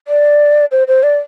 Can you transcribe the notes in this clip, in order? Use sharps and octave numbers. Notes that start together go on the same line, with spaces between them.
D5
C5
C5
D5